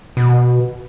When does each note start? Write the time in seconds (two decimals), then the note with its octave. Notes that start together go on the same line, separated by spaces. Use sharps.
0.17 B2